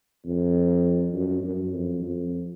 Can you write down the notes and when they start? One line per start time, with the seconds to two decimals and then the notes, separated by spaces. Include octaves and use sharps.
0.26 F2
1.14 F#2
1.44 F#2
1.74 F2
2.03 F2